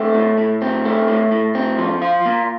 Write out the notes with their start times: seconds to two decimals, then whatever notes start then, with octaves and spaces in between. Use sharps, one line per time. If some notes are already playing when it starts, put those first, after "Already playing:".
Already playing: A3 C4
0.14 A2
0.38 A2
0.62 C4
0.85 A3
1.08 A2
1.32 A2
1.55 C4
1.78 F3
2.02 F4
2.26 A#2